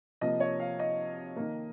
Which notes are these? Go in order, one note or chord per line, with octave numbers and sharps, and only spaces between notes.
C3 F3 A#3 D#5
C#5
F5
D#5
D#3 A#3